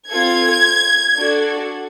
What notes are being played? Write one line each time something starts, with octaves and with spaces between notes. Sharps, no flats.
C4 F4 A4 G#6
D4 F#4 A4